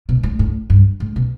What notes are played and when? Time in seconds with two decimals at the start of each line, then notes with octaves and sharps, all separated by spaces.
0.09 B2
0.23 A2
0.39 A2
0.70 G2
1.00 A2
1.16 B2